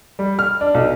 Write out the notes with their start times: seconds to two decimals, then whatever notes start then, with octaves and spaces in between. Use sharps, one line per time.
0.19 G3
0.39 F6
0.61 D4
0.74 B1